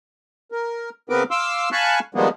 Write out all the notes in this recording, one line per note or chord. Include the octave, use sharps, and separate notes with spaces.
A#4
C#3 B3 C4 A#4 B4 D6
F5 C6 D6 E6
F5 G#5 A5 B5 C#6 F#6
D#3 F3 G3 G#3 A#3 B3